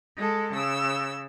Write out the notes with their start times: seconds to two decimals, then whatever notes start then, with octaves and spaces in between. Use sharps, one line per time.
0.15 G#3 A4
0.53 C#3 E6